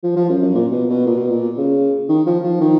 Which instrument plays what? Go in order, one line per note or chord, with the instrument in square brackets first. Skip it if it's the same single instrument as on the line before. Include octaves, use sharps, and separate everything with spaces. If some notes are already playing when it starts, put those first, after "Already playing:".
[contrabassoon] F3
F3
F#2
F#2
A#2
B2
B2
A#2
B2
A#2
C#3
D#3
F3
F3
D#3